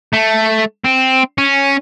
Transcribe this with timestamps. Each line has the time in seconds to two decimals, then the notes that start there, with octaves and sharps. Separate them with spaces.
0.13 A3
0.84 C4
1.38 C#4